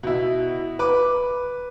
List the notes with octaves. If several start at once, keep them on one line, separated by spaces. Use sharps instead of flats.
B2 E4
B4 D6